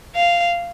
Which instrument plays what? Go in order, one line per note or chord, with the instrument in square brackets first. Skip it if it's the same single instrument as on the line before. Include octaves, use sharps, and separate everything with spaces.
[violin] F5